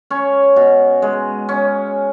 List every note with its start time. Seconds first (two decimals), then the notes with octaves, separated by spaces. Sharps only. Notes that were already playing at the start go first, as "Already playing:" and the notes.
0.10 C#4 C#5
0.56 B2
1.02 G#3
1.49 C#4